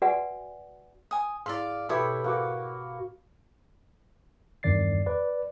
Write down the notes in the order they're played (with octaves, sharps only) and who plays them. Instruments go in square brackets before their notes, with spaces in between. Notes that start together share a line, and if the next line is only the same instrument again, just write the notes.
[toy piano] F#4 B4 D5 E5 F#5 G#5
[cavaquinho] G#5 D#6
[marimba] G#2 E4 A6 [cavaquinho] D5 F5
[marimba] G#2 B2 G#6 [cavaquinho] E4 C#5 [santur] G4 A4 B4
[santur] A#3 F#4 E6
[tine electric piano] E2 G2 D#3 D5 A6 C7
B4 D5